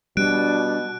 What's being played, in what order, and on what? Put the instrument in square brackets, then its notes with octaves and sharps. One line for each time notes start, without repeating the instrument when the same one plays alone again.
[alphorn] B2 [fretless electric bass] G3 [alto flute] D4 [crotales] F#6 D7